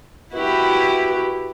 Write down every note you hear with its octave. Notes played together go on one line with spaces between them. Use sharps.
E4 F#4 G4 B4